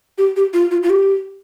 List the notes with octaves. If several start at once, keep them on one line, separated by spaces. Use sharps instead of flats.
G4
G4
F4
F4
F4
G4